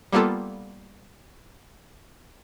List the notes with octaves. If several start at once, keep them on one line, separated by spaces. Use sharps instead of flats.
G3 A#3 B3 F4 A4